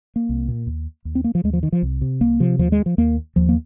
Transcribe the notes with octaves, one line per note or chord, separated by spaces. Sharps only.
A#3
C2
A#2
D#2
D#2
C4
A#3
F3
D#2 G#3
F3
D#3
F3
C2
C3
C2 A#3
C3 F3
D#2 F3
G#3
F3
D#2 A#3
D#2 F3
A#3